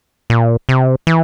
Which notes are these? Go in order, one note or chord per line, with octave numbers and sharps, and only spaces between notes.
A#2
C3
E3